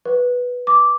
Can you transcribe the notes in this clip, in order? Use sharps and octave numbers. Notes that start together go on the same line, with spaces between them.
B4
D6